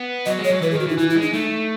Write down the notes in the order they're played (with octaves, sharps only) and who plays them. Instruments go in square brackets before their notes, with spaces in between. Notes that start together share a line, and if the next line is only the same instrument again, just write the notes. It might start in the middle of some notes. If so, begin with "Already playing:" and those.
Already playing: [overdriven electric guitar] B3
[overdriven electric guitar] F#3 [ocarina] D#5
[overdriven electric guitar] G#3
[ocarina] C#5
[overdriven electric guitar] F#3
[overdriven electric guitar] E3 [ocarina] B4
[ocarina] G#4
[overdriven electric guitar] D#3
[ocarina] F#4
[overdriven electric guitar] E3
[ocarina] D#4
[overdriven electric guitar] E3 [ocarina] E4
[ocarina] E4
[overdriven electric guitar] G#3
[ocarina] D#4
[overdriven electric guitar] A3 [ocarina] D#4